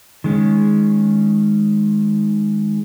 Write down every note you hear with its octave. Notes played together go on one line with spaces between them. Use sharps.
D#3 G#3 C#4